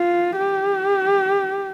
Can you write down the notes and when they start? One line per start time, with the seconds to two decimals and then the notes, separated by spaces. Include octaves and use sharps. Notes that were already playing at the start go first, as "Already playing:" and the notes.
Already playing: F4
0.38 G4